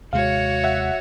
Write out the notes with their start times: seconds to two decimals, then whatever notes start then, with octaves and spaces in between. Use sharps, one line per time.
0.13 D#2 C3 G#3 F#4 C#5 F5
0.64 E5 F#5